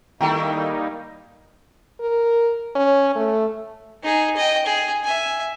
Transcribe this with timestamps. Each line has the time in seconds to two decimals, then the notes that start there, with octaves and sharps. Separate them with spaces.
0.21 D#3 G3 A3 A#3 D#4 E4 G5 A#5
2.00 A#4
2.76 C#4
3.15 A3
4.03 D#4 G#4
4.36 D#5 G5
4.66 G#4
5.04 E5 G#5